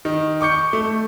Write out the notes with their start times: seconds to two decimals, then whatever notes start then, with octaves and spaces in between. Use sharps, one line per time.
0.05 D#3
0.41 C#6 D6 G6 C#7
0.73 A3